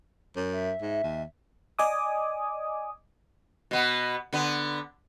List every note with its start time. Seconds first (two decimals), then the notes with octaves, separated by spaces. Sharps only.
0.36 F#2
0.53 E5
0.81 G#2
1.03 D#2
1.79 D5 D#5 G#5 D6 D#6
3.71 B2 B3
4.33 D3 B3